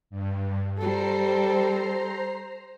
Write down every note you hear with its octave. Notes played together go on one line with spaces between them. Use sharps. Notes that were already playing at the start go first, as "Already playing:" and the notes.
G2
G3 A4 C5 A#5 C7